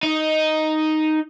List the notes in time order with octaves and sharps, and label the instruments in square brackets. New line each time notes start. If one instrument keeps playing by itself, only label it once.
[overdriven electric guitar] D#4